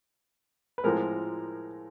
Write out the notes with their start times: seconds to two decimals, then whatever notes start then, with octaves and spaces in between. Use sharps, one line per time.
0.78 B4
0.84 A2 F3 G#3 C4 A#4